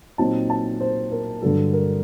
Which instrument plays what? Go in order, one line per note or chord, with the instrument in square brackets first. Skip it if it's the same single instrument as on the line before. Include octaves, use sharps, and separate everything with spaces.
[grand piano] A#2 F#3 C4 D#4 A5
A5
C5
A#4
G2 D3 F#3 A4
A#4